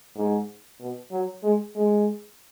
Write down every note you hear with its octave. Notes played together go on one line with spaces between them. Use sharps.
G#2
B2
F#3
G#3
G#3